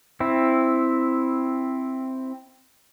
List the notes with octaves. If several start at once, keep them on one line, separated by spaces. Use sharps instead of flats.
C4 E4